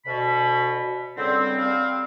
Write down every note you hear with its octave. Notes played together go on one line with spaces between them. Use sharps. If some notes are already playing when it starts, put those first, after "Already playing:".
D2 B2 B5
C#2 D3 G3 C4
G3 C4 F5